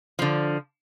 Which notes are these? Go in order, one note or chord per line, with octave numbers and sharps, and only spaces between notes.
D3 F3